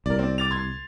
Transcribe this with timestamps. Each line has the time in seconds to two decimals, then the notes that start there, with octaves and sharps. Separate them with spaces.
0.06 C2 A#4 D5
0.19 C4 D5
0.38 D6 A6 F7
0.51 C6 G#6